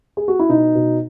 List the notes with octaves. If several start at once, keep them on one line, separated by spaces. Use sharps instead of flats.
G#4
F#4
E4
B2 D#4
B2